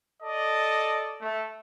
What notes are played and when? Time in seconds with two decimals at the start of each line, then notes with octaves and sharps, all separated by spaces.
0.23 A4 D5 D#5
1.22 A3